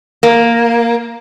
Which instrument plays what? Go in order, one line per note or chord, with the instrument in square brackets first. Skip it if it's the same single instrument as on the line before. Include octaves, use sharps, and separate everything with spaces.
[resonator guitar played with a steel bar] A#3